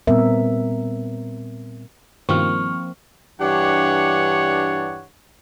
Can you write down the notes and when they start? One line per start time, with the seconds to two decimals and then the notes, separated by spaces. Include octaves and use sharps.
0.07 A#2 G3 B3 C4 A#4 E5
2.29 G2 B2 D#3 F3 A#3 C4 C#6 F6
3.40 G2 E3 D4 G4 C#5 F#5